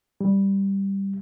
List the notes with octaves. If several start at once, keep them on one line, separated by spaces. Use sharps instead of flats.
G3